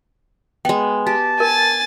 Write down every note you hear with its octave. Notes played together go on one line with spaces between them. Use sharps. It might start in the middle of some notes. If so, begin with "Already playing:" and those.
G#3 B3 G5
G4 A5
A#4 G#5 A6